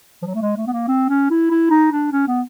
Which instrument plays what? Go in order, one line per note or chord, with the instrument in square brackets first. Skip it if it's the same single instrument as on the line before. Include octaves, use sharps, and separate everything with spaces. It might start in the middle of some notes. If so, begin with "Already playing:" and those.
[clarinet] F3
F#3
A3
G#3
A3
B3
A#3
C4
C#4
E4
E4
D#4
D4
C#4
B3